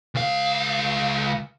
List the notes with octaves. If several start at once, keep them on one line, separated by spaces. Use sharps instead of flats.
C#2 F5